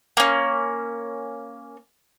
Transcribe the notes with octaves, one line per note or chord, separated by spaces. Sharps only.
A#3 C#4